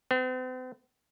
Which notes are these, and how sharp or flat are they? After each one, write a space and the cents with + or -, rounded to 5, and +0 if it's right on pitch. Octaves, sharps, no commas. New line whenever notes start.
C4 -45